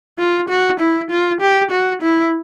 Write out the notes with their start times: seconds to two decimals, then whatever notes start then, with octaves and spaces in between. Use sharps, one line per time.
0.19 F4
0.49 F#4
0.80 E4
1.10 F4
1.41 G4
1.71 F#4
2.02 E4